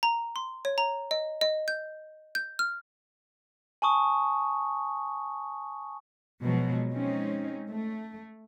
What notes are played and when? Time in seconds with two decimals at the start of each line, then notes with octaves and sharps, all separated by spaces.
0.03 A#5
0.36 C6
0.65 C#5
0.78 A#5
1.11 D#5
1.41 D#5
1.68 G6
2.35 G6
2.59 F6
3.82 G#5 A5 C#6 D#6
6.43 B2 F3 F#3 G#3
6.92 G#3 C4 C#4 D#4
7.70 A3